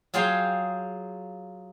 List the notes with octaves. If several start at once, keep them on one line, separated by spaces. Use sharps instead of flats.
F#3 F4 G#4 F5 G5 G#5